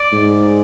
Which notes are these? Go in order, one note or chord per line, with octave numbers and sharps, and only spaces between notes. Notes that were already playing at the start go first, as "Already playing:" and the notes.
Already playing: D5
G#2